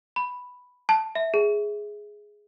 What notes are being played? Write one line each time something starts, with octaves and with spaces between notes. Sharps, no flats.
B5
A5
E5
G#4